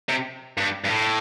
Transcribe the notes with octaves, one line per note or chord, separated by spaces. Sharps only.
C3
G2
G2
A2